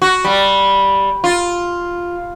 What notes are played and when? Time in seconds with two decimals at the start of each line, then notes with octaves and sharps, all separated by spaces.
0.02 F#4
0.24 G3
1.24 F4